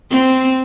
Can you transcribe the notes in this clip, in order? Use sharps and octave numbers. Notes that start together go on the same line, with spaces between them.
C4